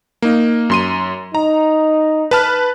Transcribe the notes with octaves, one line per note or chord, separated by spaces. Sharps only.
A#3 D#4
F#2 C6 D#7
D#4 A#5
B4 A5 F6